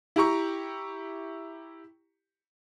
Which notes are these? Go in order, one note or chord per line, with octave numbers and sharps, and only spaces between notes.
E4 G4 A#5 C#6